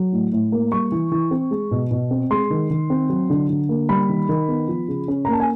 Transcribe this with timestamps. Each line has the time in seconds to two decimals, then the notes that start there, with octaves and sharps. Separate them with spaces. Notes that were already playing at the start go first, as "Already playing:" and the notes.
Already playing: F#3
0.12 A2
0.32 A2
0.52 A#3
0.72 G3 C#6
0.92 E3
1.12 E3
1.31 C4
1.51 G#3
1.71 B2
1.91 B2
2.11 C4
2.31 G#3 C6
2.50 D#3
2.70 D#3
2.90 C4
3.10 F#3
3.30 D3
3.49 D3
3.69 A#3
3.89 G3 B5
4.09 D#3
4.29 D#3
4.48 B3
4.68 F3
4.88 C#3
5.08 C#4
5.25 A#5
5.28 A#3
5.33 A5
5.40 G#5